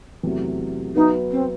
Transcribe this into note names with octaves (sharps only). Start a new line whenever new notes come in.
E2 C3 F#3 A3
F#3 B3 D#4 F#4 B4 E5
C4